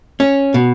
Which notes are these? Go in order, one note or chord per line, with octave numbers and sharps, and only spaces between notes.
C#4
B2